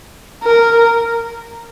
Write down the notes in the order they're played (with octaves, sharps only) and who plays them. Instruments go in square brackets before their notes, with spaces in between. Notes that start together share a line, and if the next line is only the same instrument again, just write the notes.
[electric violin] A#4